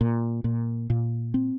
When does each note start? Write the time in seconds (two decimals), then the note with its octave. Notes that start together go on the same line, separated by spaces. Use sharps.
0.01 A#2
0.44 A#2
0.90 A#2
1.34 C4